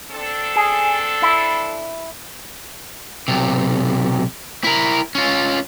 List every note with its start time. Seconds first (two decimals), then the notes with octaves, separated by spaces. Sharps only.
0.11 C4 D4 A4
0.56 G#4
1.22 E4
3.28 B1 C3
4.64 E4 A#4
5.15 C#4 F4